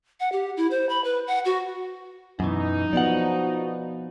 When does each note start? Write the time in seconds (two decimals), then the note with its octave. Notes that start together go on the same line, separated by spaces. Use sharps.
0.20 F#5
0.32 G4
0.57 E4
0.71 C5
0.89 B5
1.04 B4
1.27 F#5
1.45 F#4
2.40 F#2 B2 E3 D#4
2.93 F3 B3 F#4 D5 F#5